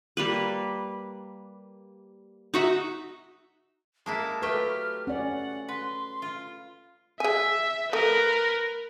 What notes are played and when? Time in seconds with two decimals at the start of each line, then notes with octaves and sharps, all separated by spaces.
0.17 G3 A#3 B4
2.54 D#4 F#4 E5
4.06 G#3 A#3 E4 A5
4.42 F#3 A3 G4 B4 F6
5.07 C#4 D5 F#5
5.69 B4 C6
6.22 F4
7.20 G#3 E5 G#5
7.93 A3 A#4 B4